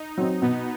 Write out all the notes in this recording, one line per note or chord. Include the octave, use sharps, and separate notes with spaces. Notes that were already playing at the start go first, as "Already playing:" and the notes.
Already playing: D#4
F#3 C4
B2 B3